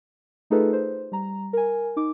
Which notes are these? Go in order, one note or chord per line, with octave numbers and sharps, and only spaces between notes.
A3 D#4 F4 G#4 A4 B4
C5
G3 A#5
A#4 G#5
D#4 D6